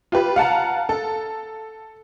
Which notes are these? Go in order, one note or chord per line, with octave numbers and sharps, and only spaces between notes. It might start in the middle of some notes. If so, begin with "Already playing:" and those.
F4 G4 B4
F5 F#5 A5 A#5
A4